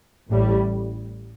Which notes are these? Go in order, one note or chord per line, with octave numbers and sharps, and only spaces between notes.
A1 A2 G3